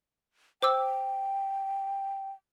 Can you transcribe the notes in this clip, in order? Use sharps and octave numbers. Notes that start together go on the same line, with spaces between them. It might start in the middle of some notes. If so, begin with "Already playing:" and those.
C5 G5 D6 E6